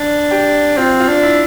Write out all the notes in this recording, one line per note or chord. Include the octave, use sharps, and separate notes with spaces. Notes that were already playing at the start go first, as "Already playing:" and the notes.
Already playing: D4
G4
C4 F4
F4
D4
E4